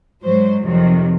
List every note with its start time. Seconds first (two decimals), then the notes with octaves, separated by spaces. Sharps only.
0.22 G#2 F#3 C5
0.62 F2 C3 D#3 F#3